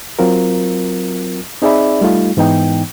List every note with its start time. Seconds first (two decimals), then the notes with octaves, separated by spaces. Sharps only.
0.19 F#3 C4 F4 A#4
1.62 C4 D#4 G#4 D5 E5 B5
2.01 G3 A3 D#4 F4
2.37 G#2 E3 B3 D#4 G5